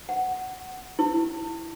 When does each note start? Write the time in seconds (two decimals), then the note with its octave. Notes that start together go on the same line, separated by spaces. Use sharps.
0.09 F#5
0.99 E4